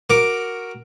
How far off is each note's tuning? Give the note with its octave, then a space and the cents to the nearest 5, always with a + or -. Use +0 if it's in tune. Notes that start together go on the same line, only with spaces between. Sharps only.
F#4 +0 A#4 +0 D6 +0